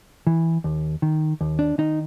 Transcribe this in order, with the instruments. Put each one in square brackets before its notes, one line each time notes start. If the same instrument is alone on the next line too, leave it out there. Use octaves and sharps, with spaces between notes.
[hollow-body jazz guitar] E3
D#2
D#3
D#2
D4
D#3 D#4